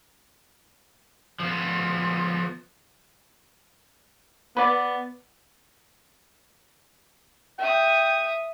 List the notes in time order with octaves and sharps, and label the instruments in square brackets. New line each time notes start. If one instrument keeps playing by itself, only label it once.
[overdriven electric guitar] F3 B3
[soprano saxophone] B3 [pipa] B4 D5
[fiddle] E5 D#6 [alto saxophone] G5